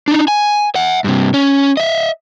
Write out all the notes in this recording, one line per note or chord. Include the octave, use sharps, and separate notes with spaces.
D4 D#4
G#5
E5 F#5
G2 C3
C#4
D#5 E5